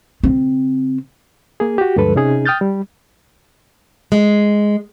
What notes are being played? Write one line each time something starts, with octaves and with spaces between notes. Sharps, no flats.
C#3 C4
A#3 G#4
F#4 G4
D2 G2 F3 G#3 A4 B4
C3 C#4 D#4 G#4
G5 D#6 F6 G6 A6
G3
G#3